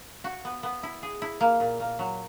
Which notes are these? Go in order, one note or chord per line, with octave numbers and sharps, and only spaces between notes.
F#4
B3
B3
E4
G#4
E4
A#3
A#2
A#3
F#3